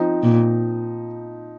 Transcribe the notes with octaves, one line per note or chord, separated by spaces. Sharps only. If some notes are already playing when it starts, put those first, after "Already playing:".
Already playing: F3 C4 D#4
A#2